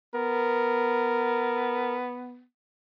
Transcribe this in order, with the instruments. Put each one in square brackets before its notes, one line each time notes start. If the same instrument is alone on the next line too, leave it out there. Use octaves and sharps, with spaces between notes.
[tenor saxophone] B3 [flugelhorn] A#4